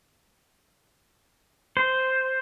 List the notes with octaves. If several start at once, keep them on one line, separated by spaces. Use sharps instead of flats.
C5